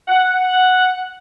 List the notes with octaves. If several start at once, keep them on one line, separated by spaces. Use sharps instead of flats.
F#5